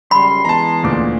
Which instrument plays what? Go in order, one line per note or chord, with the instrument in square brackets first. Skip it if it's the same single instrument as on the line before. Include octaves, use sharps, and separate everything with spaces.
[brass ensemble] C#2 F#2 G3 [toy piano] B5 [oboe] C6
[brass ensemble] E3 G#3 B3 [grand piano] A5 A#5
[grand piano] D2 A#2 D6